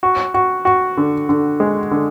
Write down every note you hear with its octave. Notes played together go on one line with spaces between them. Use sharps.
F#4
F#4
F#4
D3
D3
G#3
D3